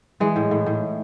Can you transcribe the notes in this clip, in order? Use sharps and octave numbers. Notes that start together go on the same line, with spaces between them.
E3 G#3
A2
A2
A2